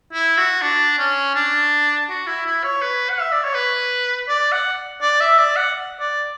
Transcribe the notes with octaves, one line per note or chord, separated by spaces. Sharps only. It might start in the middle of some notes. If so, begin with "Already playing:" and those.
E4
F#4
D4
C#4
D4
F#4
E4
E4
C#5
B4
F#5
E5
D5
C#5
B4
D5
F#5
D5
E5
D5
F#5
D5